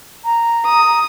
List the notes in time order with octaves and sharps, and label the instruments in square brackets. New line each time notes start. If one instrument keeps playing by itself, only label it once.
[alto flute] A#5
[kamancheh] D#6